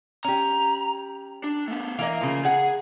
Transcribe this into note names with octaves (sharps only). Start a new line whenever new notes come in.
C#4 G4 A#5
D4
A3 B3
E3 A#4 D#5 F5
C#3 F3
G#4 F#5